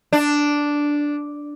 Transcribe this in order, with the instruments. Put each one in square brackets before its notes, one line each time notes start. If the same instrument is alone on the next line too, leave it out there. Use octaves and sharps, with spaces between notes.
[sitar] D4